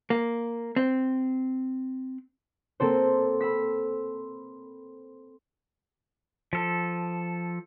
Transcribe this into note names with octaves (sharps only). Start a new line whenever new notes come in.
A#3
C4
A#3 C4 A4 C5
B5 E6 B6
F3 A4